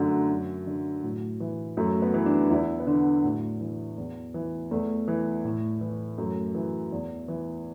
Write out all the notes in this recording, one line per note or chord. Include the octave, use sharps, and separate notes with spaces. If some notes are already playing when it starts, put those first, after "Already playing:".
Already playing: F#2 D3 A3
F#2
D3
A2 F#3
E3
F#2 A3
B3
E3
D4
E2 E4
B3
D3 D4
A2 F#3
E3
E2
E3
E2 A3
E3
A2
E3
F#2 A3
E3
E2
E3